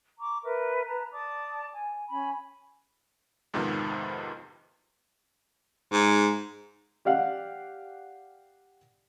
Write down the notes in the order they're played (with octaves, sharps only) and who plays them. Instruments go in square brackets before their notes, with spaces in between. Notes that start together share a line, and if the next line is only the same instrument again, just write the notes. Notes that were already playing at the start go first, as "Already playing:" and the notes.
[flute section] A#5 C#6 D6
A#4 B4 E5
B4 A5 A#5
D5 A5 D6 D#6
G#5
C#4 G#5 B5
[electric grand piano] F2 G#2 C3 D#3 F3 B3
[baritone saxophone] G#2
[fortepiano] G4 D5 F5 F#5